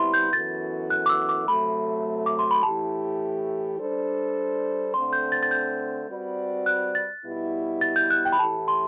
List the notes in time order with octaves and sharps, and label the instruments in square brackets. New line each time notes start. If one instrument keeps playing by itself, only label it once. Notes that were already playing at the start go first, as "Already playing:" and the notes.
Already playing: [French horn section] C3 G3 B3 E4 [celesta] B5 C6
[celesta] G6
[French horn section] F#2 E3 B3 F#4 A4 [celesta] A6
[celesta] F#6
D6
E6
D6
[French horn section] C3 F#3 A3 [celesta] B5
[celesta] D6
C6
B5
[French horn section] A2 E3 A3 E4 G4 [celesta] A5
[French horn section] G3 D4 A4 C5
[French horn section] D3 A3 C4 [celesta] C6
[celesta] G6
A6
A6
G6
[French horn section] G3 C4 F#4 B4 D5
[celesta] F#6
A6
[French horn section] B2 G3 B3 E4
[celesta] A6
G6
F#6
G5
B5
[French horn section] A2 E3 A3 E4 G4 [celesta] A5
[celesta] C6